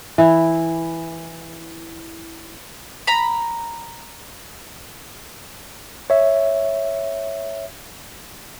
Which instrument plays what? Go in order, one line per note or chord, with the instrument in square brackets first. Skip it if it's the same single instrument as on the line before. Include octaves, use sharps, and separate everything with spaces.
[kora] E3 E4
[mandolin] A#5 B5
[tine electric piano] C#5 E5